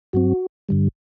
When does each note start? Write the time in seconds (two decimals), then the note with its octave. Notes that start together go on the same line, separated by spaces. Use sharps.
0.13 G2 F#3 C4 F#4
0.69 G2 D3 G3